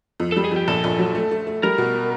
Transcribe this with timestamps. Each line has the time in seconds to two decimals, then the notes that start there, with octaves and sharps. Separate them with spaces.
0.20 F2
0.32 A4
0.37 G3
0.45 G#4
0.51 F2 G4
0.68 A#1 A4
0.84 A#1
0.99 F#3
1.15 A3
1.31 A3
1.47 A3
1.63 G3 A#4
1.78 B2